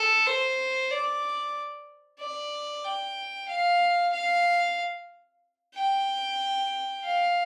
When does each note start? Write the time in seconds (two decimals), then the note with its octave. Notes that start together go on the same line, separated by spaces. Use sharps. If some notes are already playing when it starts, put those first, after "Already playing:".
Already playing: A4
0.26 C5
0.91 D5
2.20 D5
2.85 G5
3.49 F5
4.13 F5
5.75 G5
7.03 F5